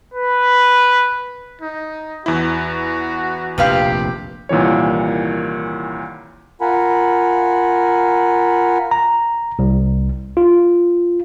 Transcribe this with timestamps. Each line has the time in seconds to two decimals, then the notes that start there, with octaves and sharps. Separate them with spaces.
0.14 B4
1.61 D#4
2.26 E2 E4 F#4
3.58 F1 A#1 D#2 C3 G4 B4 F5
4.49 C2 A#2 D#3 E3 C#5
6.61 F4 A#4 F#5 G#5 B5
8.91 A#5
9.59 C2
10.37 F4